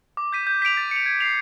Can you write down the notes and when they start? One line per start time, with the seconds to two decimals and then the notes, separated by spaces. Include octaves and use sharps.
0.17 D6
0.33 G6 B6 D#7
0.47 G6
0.62 B6 D7 F7
0.77 A6
0.91 C#7 F7
1.06 G#6
1.21 C7 F7